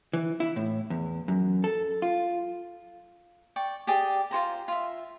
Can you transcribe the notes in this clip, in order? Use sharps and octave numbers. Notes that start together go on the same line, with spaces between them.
E3
E4
A2
E2
F#2
A4
F4
D5 G5 C#6
G4 G#4 D5 G5
F4 F#4 C5 A#5
F4 E5